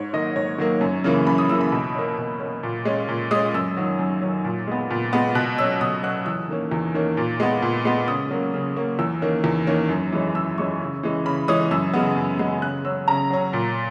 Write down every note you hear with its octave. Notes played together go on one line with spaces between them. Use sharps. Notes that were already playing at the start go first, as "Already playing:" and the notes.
Already playing: G#2 C#5
D#3 F#3 A#3 D#5
G#2 C#5
D#3 F#3 A#3
F#2
C#3 E3 A#3
F#2 B5
D#6
C#3 E3 A#3 E6
B5
B2 B5
A#3 C#4
B2
A#3 C#4
A#2
G#3 C#4
A#2
G#3 C#4 D#6
F#2 E6
D#3 F#3 C#4
F#2
D#3 F#3 C#4
A#2
G#3 B3
A#2
G#3 B3
B2 F#6
F#3 C#4 E6
B2 D#6
F#3 C#4 F#6
E2 E6
D#3 A#3 C#4
E2
D#3 A#3 C#4
A#2
G#3 B3
A#2
G#3 B3
C#3 D#6
F#3 A#3 C#4
C#3
F#3 A#3 C#4
E2 E6
D#3 A#3 C#4
E2
D#3 A#3 C#4
F#2
E3 G#3 C#4
F#2 E6
E3 G#3 C#4 C#6
C#3
E3 G#3 C#4
C#3 B5
E3 G#3 C#4 D#6
F#2 E6
C#3 G#3 B3
F#2
C#3 G#3 B3
C#3 F#6
F#3 C#4 E6
C#3 A#5
F#3 C#4
A#2